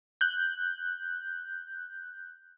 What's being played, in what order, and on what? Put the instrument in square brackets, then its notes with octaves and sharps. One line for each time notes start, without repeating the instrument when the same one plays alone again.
[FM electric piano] F#6 G6